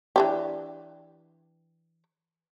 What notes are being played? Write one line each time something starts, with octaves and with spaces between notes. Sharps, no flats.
E3 D4 G4